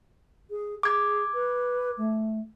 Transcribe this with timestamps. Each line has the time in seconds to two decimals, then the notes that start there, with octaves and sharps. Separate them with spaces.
0.50 G#4
0.83 G#4 D6 G#6
1.34 B4
1.98 A3